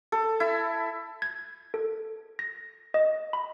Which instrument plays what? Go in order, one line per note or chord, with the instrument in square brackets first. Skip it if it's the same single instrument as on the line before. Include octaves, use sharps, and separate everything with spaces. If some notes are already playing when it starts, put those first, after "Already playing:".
[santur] A4
E4
[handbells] G#6
A4
A#6
D#5
B5